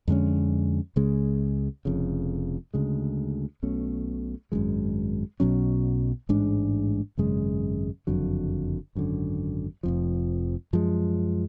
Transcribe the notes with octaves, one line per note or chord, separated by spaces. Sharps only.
F2 D3 G#3 C#4
C#2 C#3 G#3
F1 F2 C#3
D2 C#3 G#3
B1 B2 A3 C#4
G#1 F#2 F3 G#3
B1 B2 F#3 C#4
A1 G#2 G#3 D4
G#1 F#2 C#3 G#3
F#1 F2 D3 F#3
G#1 F#2 D3
F1 F2 F3
F#2 F3 G#3